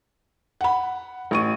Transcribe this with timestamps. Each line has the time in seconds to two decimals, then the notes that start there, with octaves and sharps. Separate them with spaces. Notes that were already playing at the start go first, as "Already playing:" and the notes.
0.61 F#5 B5
1.31 A1 C#6 D#7